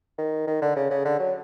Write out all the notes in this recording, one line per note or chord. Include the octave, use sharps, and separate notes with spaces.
D#3
D#3
D3
C#3
C#3
D3
F#3